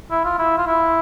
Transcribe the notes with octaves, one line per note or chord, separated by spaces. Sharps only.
E4
F4
E4
F4
E4